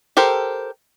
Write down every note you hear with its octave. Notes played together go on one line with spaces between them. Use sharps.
G4 A4 A#4 C5